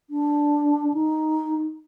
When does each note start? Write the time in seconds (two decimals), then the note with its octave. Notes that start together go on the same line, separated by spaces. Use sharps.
0.10 D4
0.94 D#4